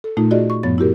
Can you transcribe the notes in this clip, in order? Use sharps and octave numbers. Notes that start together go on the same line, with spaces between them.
A4
A#2 A3 D#4 F4
F4 F#4 G#4 D5 D#5
C#6
F#2 A2 F3 B3 C#5 A6
E4 F#4 G4 A#4